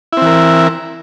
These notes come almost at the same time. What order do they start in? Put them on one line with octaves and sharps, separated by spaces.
E4 C4 E3 A#4